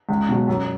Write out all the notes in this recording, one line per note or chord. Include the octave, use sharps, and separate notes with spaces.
C#2
B2 F#3
F#2